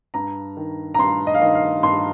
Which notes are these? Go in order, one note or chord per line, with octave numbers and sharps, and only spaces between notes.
G2 A#5
D#3
A#5
G2 C6
D#5
F5
D#3 D#5
F5
G2 C6